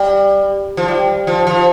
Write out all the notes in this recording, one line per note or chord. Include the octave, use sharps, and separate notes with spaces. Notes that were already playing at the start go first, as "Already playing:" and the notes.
Already playing: G3
F3
G3
F3
F3